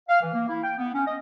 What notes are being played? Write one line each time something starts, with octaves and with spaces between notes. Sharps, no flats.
F5
E3
A#3
E4
G5
B3
C#4
D#5